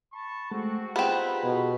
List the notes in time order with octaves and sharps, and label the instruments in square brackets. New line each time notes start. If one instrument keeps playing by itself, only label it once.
[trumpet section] A5 B5 C#6
[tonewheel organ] G#3 A3 [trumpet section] C4 F#4
[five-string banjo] B3 C4 [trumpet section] D#4 B5 [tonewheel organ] F4 G4 G#4
[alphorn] B2